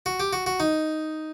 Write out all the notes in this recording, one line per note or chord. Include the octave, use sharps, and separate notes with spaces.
F#4
G4
F#4
F#4
D#4